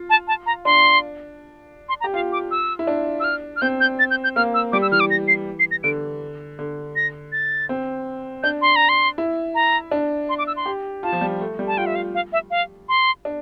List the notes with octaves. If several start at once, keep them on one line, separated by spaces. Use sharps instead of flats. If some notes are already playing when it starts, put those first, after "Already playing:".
Already playing: F4
A5
A5
A#5
D4 C6
C6
A#5
G4
F4 F5
D6
E6
E4
D4
E6
F6
F6
C4 G6
G6
A6
G6
G6
A#3 F6
E6
G3 D6
E6
E3 F6
D6
A#6
C7
C7
A#6
D3 D7
D3
A#6
A6
C4
D4 G6
C6
A#5
C6
E4
A#5
D4
C6
D6
E6
C6
G4
F4 A5
F3
G3
A3
G3
A5
F4 G5
E5
F5
F5
E5
F5
C6
D4